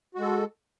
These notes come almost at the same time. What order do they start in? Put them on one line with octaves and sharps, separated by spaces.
F#4 G#3 A4